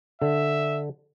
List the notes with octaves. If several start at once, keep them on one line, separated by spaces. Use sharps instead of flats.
D3 E5